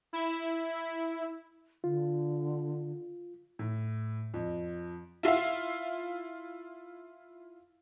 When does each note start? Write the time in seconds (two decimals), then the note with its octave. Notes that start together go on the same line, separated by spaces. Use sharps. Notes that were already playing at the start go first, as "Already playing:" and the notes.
0.13 E4
1.84 D3 F4
3.59 A2
4.34 F2
5.23 E4 F4 E5 F5